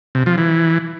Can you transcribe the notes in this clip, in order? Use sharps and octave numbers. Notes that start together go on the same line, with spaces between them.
C3
F3
E3